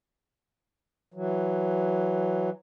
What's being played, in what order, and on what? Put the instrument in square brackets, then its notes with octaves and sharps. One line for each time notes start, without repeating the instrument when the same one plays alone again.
[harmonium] E3 F#3